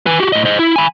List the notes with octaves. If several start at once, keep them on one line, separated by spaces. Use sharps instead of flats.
B4 G#5
F#4 G4
A2 D#5
C5 D#5
E4
G#5 B5